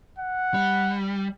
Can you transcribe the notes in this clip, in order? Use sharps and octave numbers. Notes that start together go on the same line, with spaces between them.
F#5
G3